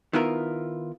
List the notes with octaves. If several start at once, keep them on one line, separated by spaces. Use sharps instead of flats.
D#3 B3 E4 F4 A#4